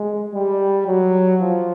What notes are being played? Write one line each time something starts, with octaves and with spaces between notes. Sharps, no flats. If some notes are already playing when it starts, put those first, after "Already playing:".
Already playing: G#3
G3
F#3
F3